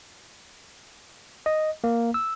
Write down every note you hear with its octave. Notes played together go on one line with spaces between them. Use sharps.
D#5
A#3
E6